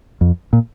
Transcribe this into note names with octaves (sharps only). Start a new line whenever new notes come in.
F2
A#2